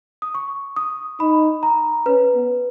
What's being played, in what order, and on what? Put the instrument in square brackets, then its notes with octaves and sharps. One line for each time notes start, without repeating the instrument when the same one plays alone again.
[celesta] D#6
C#6
D#6
[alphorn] D#4 [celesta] B5
[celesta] A#5
[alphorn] C#4 [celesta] B4
[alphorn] B3